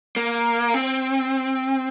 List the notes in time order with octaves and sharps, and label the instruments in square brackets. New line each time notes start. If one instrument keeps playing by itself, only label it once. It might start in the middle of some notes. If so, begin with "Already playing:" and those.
[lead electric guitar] A#3
C4